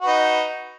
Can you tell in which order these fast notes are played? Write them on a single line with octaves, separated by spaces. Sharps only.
F#4 B4 D#4